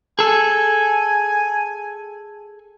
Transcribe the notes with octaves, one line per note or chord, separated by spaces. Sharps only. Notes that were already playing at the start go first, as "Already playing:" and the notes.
G#4 A4 G#5